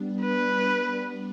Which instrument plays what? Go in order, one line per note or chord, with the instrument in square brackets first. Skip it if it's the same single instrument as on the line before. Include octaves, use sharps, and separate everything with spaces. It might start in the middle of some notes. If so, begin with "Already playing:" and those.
Already playing: [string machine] G3 B3 D4
[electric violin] B4